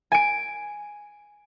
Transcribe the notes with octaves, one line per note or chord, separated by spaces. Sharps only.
G#5 D7